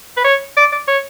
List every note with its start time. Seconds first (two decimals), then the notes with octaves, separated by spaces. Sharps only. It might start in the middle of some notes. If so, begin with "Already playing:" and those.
0.17 B4
0.24 C#5
0.57 D5
0.72 D5
0.88 C#5